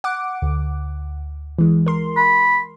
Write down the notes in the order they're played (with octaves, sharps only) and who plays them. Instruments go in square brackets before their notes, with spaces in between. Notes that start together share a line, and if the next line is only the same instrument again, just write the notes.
[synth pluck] F#5 D6
D2
E3 G#3
A#4 C6
[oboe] B5